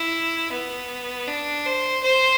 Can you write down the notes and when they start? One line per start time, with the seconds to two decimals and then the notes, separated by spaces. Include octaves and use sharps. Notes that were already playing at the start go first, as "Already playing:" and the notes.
Already playing: E4
0.52 B3
1.27 D4
1.65 C5
2.03 C5